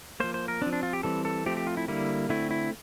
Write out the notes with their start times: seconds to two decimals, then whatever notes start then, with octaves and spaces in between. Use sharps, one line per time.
0.20 F3 A#3 C5
0.34 C5
0.48 A#4
0.62 C4 D4
0.66 F3
0.73 D4
0.83 F4
0.93 G4
1.03 E3 G3 C4 A4
1.25 A4
1.46 F3 A3 C4 G4
1.57 G4
1.67 F4
1.77 E4
1.88 D3 G3 A#3 E4
2.29 D3 A3 C4 E4
2.51 E4